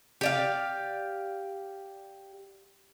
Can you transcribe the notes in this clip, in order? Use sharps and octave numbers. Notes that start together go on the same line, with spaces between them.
G4 D5 F5